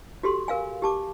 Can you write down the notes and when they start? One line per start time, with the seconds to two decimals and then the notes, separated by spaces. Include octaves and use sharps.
0.23 F#4 G4 A4 C6
0.48 A#4 F5 G#5
0.82 G4 A5 D6